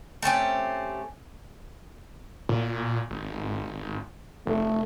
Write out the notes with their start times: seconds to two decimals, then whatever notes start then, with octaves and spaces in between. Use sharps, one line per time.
0.22 A3 C4 C#4 G4
2.49 A#2
3.10 G#1
4.47 F1 A3